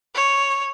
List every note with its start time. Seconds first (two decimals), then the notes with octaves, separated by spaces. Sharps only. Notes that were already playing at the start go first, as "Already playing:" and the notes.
0.15 C#5